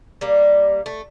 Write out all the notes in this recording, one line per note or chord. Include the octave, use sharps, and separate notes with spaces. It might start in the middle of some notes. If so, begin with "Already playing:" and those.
G3 A#3
A3